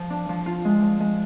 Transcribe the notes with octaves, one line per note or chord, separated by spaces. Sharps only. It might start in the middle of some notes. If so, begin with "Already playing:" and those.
Already playing: F3
D4
F3
F4
G#3
F3
G#3